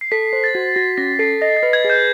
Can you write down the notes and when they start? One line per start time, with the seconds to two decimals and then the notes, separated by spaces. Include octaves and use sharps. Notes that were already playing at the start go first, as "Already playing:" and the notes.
0.01 C7
0.12 A4 B6
0.33 C5
0.44 A6
0.55 F#4
0.76 F#4 A#6
0.98 C#4 A#6
1.19 A4 C7
1.42 D#5 A#6
1.57 A6
1.63 B4
1.73 G#6
1.85 G#4
1.90 G6